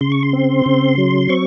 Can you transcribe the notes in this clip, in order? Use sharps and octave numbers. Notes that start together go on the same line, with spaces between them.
C#3 C6
C#6
C6
C4
C#3
F#3
C4 C#6